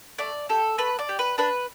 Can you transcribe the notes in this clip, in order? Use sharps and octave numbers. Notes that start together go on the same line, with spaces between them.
A3 D5
G4 A4
A3 B4
D5
G4
B4
D4 B4